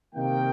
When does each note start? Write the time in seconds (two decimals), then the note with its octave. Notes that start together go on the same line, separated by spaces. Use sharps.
0.15 C3 D#3 A#3 G5